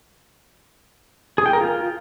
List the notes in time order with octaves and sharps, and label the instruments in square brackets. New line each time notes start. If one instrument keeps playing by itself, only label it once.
[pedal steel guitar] G#4
G5
A#4
F4